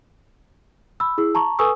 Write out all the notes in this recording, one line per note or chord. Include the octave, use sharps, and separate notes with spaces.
B5 E6
E4 G#4 E6
A5 A#5 C#6
A4 B4 G#5 C#6 D#6 E6